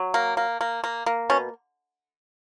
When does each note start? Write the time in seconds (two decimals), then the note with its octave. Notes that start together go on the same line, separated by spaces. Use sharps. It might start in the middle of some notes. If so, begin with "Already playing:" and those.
Already playing: F#3
0.14 A#3
0.37 A#3
0.61 A#3
0.84 A#3
1.06 A#3
1.30 B2 C#4